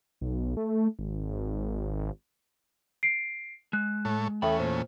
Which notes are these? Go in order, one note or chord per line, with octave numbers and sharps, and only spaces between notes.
B1
A3
G#1
C7 D7
G#3 F#6
A2 A4 C#5
E2 A3 C#4 A4 E5 G5 B5
A#2 C5